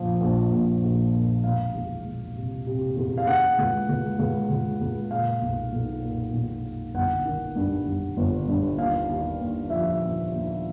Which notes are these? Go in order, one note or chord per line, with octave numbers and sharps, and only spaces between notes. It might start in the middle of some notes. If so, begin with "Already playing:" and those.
Already playing: A#1 F3
A#1
A#1
A#1
A#2
E1 F5
E2
E1
C3
C3
E2
F5
C#3 F#5
C#2
C#2
C#2
C#2
C#2
A#2 F5
B1
B1
A#2
B1
A#2
G1 F#5
D#3
G2
G2
G1
G2
D#2 F5
D#2
D#2
F3 E5
D#2
D#2